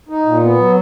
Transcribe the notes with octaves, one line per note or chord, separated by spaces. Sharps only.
D#4
A#2
B3
F#3